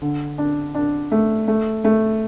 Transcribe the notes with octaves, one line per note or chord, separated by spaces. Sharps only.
D3
D4
D4
A3
A3
A3